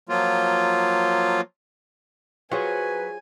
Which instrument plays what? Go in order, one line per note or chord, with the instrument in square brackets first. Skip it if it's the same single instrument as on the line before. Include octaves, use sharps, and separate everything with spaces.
[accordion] F3 F#3 A#3 F4
[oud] F#3 [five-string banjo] F4 G#4 C5 [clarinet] B4 [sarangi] G#5